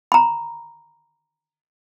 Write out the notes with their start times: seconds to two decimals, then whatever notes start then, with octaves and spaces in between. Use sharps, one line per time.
0.12 A#5 B5